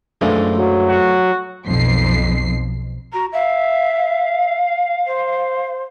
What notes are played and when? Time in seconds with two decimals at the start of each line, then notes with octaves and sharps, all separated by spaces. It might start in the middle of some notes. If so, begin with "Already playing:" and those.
0.21 F#2 E3 F3 G#3 A3 D4
0.55 F#3
0.89 F#4
1.68 B1 F2 C7
3.13 F#4 A#5
3.33 E5 F5
5.07 C5